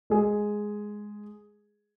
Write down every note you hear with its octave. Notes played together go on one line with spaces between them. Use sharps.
G#3 G#4